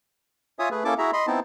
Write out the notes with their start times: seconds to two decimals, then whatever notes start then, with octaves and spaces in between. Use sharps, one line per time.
0.59 F4 C#5 E5 G#5 D#6
0.71 A3 G#4 B4
0.85 A#3 C#4 E4 A4 A5 D6
0.98 E4 F#4 G#4 E5 A#5
1.13 D#5 B5 C6
1.27 B3 C4 D#4 E4 A5